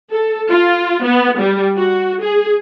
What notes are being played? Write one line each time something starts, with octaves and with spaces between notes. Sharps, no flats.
A4
F4
B3
G3
F#4
G#4